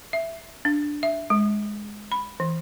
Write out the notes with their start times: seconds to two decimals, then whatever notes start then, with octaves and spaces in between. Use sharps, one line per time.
0.13 E5
0.65 D4
1.03 E5
1.30 G#3
2.12 B5
2.40 E3